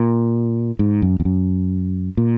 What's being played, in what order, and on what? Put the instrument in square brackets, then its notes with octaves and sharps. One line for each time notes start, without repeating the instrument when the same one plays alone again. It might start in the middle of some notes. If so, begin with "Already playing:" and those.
Already playing: [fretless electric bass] A#2
G#2
F#2
E2
F#2
A#2